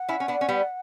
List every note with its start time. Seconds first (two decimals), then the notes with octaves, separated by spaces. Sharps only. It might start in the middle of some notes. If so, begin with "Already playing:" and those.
Already playing: F#5
0.08 C#4 E4
0.20 C#4
0.28 B3 D4
0.41 C#4
0.48 G3 B3